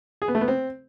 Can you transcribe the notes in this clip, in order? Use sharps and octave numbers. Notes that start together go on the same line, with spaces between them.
G#4
B3
A3
B3
C4